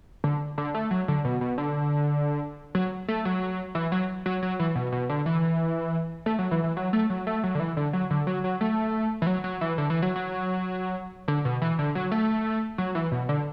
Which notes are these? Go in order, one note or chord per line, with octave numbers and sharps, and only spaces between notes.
D3
D3
A3
F#3
D3
B2
B2
D3
F#3
A3
F#3
E3
F#3
F#3
F#3
E3
B2
B2
D3
E3
A3
F#3
E3
E3
F#3
A3
F#3
A3
F#3
D3
E3
D3
F#3
D3
F#3
F#3
A3
E3
F#3
F#3
E3
D3
E3
F#3
F#3
D3
B2
E3
D3
F#3
A3
F#3
E3
B2
D3